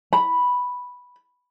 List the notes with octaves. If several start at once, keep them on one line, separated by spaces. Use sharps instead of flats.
B5